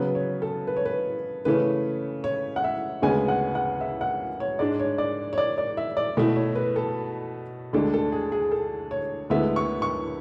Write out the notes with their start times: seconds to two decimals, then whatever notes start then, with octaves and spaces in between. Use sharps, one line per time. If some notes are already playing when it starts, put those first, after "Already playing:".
Already playing: C#3 F#3 B3 B4
0.15 C#5
0.42 A4
0.67 B4
0.77 C#5
0.86 B4
1.45 C#3 E3 A3 C#4 B4
2.24 C#5
2.56 F#5
2.64 E5
3.02 D2 C#3 G#3 B3 G#5
3.28 F#5
3.55 F#5
3.81 E5
4.01 F#5
4.40 C#5
4.59 G#2 G#3 D4 D5
4.79 C#5
4.98 D5
5.33 C#5
5.38 D5
5.58 D5
5.77 E5
5.97 D5
6.17 B2 A3 E4
6.36 C#5
6.55 B4
6.76 A4
7.73 D2 D3 G#3 D4 A4
7.94 A4
8.12 G#4
8.32 G#4
8.52 A4
8.91 C#5
9.30 D2 D3 G#3 B3 E4 E5
9.56 C#6
9.82 C#6